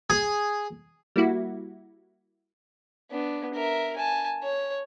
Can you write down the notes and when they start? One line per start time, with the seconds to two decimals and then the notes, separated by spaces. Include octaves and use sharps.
0.10 G#4
1.16 G3 A#3 E4 F#4
3.11 B3 D4
3.54 A#4 E5
3.97 G#5 A5
4.43 C#5